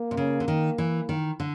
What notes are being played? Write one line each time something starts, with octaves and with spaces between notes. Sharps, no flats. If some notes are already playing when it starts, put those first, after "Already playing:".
Already playing: A#3
C3
C#3
D3
D#3
E3
D#3
D3